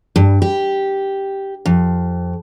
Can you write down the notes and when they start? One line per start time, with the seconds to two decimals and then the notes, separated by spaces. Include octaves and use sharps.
0.16 G2
0.42 G4
1.66 F2